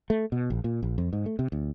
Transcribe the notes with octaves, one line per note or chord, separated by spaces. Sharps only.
A3
B2
A#1
A#2
A#1
F2
G#2
A3
C3
D2